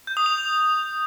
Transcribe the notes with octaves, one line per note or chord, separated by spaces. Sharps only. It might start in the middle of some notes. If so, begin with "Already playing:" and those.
G6
D#6
F7